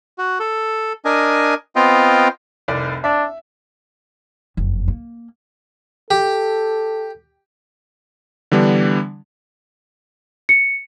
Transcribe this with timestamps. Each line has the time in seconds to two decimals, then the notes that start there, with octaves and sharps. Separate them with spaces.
0.18 F#4
0.40 A4
1.05 D4 A#4 D#5 G#5
1.76 B3 C4 F4 D#5 F5 G5
2.68 F1 C2 D5
3.04 D4 E5
4.57 F#1 F2
4.88 A#3
6.11 G4 A4
8.52 D3 E3 G3 B3 D4
10.49 C#7